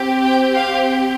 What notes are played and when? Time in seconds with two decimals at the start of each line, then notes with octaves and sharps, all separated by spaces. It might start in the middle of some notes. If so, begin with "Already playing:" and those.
Already playing: C4 G4
0.24 G5
0.55 F5